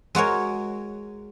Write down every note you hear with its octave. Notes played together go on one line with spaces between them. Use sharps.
G#3 F#4 A#4 C#5